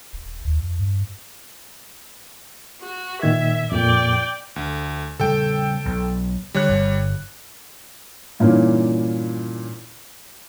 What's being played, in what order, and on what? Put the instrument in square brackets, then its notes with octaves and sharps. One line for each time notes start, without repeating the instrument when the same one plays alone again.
[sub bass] D#1
D#2
F2
G2
[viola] F#4
[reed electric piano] A#2 D#3 G#6 [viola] E5
[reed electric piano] F2 A#2 [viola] D5 G5
[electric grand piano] D2
[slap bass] C#3 G3 A3 [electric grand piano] A4 G5
[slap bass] B1
[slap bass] D3 [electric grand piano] G3 C#5 F#6
[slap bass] G1
[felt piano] G2 A#2 E3 A#3 C#4 D#4